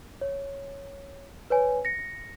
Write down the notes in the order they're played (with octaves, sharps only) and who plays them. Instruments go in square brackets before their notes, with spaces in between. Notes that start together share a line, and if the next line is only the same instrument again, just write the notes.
[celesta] C#5
B4 C#5 G#5
A#6 C#7